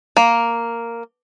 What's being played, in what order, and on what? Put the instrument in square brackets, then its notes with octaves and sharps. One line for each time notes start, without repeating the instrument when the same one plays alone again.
[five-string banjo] A#3